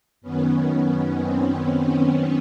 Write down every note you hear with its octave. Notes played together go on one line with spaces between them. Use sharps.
F#2 D#3 B3 C#4
C4
C4
B3 C#4